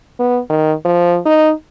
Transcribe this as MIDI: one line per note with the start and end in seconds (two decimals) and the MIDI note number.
0.19 0.40 59
0.50 0.73 51
0.85 1.18 53
1.26 1.52 63